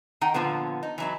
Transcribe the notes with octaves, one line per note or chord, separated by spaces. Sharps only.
D#3 D#4 F#5 G5
A#2 D3 F3 B3
D#4
E3 F#3 E4